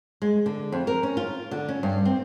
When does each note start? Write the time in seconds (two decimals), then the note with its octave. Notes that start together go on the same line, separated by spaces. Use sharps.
0.22 G#3
0.46 D3
0.72 F2
0.87 A#4
1.03 C#4
1.17 F4
1.51 D3
1.69 C#4
1.83 G2
2.05 C4